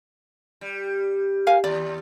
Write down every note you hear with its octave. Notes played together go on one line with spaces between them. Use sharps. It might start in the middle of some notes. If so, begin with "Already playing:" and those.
G3
A#4 F5 G#5
D#2 D5